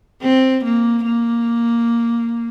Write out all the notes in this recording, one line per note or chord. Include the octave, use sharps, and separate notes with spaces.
C4
A#3
A#3